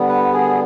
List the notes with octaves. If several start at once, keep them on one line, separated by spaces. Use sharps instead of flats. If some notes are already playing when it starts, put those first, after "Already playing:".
Already playing: D3 G3 B3
B4
G#4